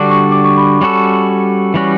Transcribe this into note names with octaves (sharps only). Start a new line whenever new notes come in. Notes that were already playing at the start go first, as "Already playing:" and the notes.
Already playing: D3 G3 D4 F#4 D6
C#6
D6
C#6
B5
G3 C#4 F#4 A4
E3 G3 C#4 F#4